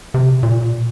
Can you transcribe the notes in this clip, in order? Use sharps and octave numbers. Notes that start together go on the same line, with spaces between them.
C3
A#2